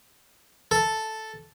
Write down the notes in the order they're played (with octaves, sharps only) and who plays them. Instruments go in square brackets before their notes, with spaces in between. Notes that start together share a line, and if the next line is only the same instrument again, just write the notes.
[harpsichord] A4